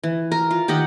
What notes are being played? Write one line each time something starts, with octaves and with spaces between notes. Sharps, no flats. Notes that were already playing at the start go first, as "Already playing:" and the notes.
E3
A#4
F4
D#3 G4 D#5 F#5